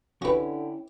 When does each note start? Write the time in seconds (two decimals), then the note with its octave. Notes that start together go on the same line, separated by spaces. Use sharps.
0.22 D3 C#4 E4 F#4 G4 B4